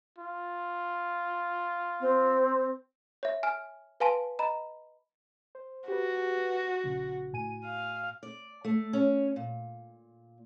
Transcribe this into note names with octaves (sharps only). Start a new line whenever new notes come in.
F4
C4
C#5 E5
G#5 F6
B4 F5 G#5 A5 C6
D#5 A#5 B5
C5
F#4 G4 B4
A#1 C#3
A2 G#5 D#7
F5
D5
A3
C#4
A#2